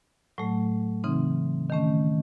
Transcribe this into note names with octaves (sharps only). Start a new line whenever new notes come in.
A2 F#3 A3
C#3 E3 C4 D#4
D#3 A3 C#4